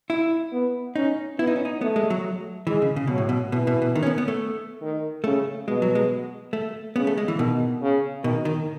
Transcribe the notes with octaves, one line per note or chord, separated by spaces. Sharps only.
E4
B3
C#4 D#4
B3 E4
D#4
C#4
D#4
A3 B3
G#3
F#3
E3 G#3
C#3
C#3
B2 F#3
A2
B2
B2 E3
B2
B2
D#3
C#4
B3
B3
A3
D#3
C#3 A3
B2 G#3
F#3
G#3
A3
C#3 B3
A3
G#3
E3
B2 D#3
C#3
B2 D#3
D#3